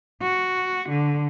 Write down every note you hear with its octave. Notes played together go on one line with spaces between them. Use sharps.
F#4
D3